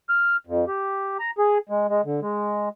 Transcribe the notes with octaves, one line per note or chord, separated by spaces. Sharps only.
F6
F2
G4
A#5
G#4
G#3
G#3
D3
G#3